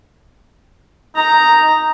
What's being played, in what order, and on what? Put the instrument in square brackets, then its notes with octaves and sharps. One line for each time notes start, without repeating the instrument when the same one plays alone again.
[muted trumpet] D#4 [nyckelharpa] A#5